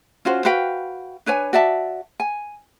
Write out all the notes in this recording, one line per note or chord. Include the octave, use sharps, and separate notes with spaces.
C#4 F4 F#4 C5
F#4 B4 F5 G5
D4 B4 C#5 G#5
F#4 D5 E5 A5
G#5